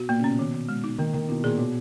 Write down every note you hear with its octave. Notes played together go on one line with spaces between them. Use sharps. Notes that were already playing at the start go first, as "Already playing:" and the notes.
Already playing: B2 F#4
A#2 A#3
C#3
B2 C#4
D#3
D#3
G#3
D#4
D#3 A#3
D#3 A#3
B2 E4
A#2 G#4
B2 D#3